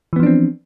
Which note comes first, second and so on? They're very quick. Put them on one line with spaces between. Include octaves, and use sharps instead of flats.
E3 B3 F3 D4 C4